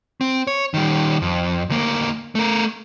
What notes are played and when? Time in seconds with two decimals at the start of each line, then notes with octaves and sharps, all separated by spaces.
0.21 C4
0.47 C#5
0.74 D#3 G3
1.22 F2
1.69 D2 A#3
2.35 A3 A#4